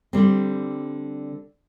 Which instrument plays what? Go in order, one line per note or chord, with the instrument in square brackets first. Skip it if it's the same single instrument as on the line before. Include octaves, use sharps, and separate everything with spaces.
[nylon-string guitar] D3 G3 C4